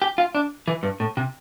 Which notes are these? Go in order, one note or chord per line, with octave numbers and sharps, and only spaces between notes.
G4
F4
D4
E3
G2
A2
C3